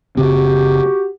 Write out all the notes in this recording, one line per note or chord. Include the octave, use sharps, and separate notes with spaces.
F#1 C#3 C4 F#4 G4